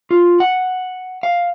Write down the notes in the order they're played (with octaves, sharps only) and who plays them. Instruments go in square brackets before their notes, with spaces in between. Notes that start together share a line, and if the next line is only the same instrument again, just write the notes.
[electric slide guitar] F4
F#5
F5